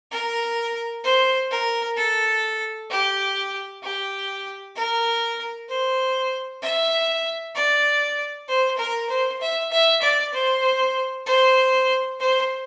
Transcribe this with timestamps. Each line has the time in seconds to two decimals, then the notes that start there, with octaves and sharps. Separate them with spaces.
0.12 A#4
1.04 C5
1.51 A#4
1.97 A4
2.91 G4
3.83 G4
4.76 A#4
5.69 C5
6.62 E5
7.55 D5
8.48 C5
8.78 A#4
9.09 C5
9.41 E5
9.72 E5
10.02 D5
10.34 C5
11.26 C5
12.20 C5